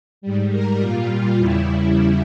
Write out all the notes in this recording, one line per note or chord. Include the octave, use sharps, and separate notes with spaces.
G#2 G3
A#4
A#2 G3 F4
E2 C#3 G3 E4